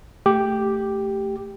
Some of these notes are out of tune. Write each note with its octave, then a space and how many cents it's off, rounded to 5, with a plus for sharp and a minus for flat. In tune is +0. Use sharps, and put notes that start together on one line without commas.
A3 +0 G4 +0